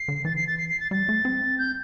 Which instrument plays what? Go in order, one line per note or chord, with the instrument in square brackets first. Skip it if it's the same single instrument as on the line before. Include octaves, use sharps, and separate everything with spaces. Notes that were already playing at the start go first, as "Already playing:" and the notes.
Already playing: [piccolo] C7
[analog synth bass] D3
[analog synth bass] E3 [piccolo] A6
[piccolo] C7
A6
C7
C7
A6
[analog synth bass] G3 [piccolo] A6
[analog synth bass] A3
C4
[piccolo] G6